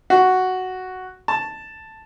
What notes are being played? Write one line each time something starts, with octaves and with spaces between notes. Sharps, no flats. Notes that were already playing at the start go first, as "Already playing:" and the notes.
F#4
A5